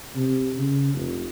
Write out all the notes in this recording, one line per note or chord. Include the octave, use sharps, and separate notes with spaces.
C3
C#3
F1